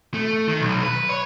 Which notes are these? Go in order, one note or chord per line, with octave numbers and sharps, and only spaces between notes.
A3
D#3
B1
B4
C#5